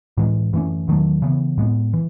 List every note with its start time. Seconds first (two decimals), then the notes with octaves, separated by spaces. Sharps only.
0.17 A2 E3 G#3
0.53 F#2 E3 A3 C#4
0.88 E2 D#3 F#3 A3
1.22 C#3 E3 B3
1.58 A2 G#3 B3
1.94 E3